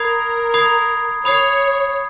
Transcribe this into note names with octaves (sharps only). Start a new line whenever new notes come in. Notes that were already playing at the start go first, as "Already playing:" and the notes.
Already playing: A#4 B5 D#6 G#6 C7
B5 D#6 G#6 C7
C#5 B5 D#6 G#6 C7